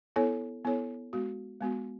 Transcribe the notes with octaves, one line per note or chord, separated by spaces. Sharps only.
B3 E4 A4 C#5
B3 E4 A4 C#5
G#3 B3 F#4
G#3 B3 F#4